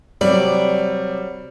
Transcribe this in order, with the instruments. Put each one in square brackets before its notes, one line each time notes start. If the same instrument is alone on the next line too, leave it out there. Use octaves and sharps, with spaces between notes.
[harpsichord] C3 F#3 [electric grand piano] G3 [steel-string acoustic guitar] D5